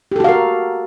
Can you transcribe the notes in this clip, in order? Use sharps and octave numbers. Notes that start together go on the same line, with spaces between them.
F#4 G4 A4 A#4 F5